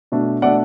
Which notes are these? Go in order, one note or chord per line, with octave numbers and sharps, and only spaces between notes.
B2 A3 D4
B2 A3 D4 D5 F#5